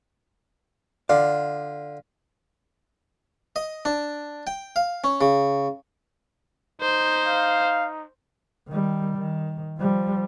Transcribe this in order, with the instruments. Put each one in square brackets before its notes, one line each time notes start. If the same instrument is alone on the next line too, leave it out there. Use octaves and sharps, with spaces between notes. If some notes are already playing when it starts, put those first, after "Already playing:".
[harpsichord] D3 F4 [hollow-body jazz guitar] D5
[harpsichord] D#5
D4
G5
F5
C#4
C#3
[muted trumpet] D#4 [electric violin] C5
[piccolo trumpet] F5
[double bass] D#3 G3
D#3
F3 G3